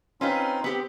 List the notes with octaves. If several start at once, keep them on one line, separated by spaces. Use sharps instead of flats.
C4 C#4 D#4 F4 B4 C6
B3 C4 G4